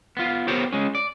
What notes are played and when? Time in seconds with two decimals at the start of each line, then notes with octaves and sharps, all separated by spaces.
0.17 B3 F4
0.48 B3 G4 A#4 C5 C#5
0.73 G#3 C#4
0.95 D5